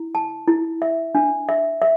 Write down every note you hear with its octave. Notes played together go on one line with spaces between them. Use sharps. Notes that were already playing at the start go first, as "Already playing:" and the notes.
Already playing: E4
A5
E4
E5
D4
E5
E5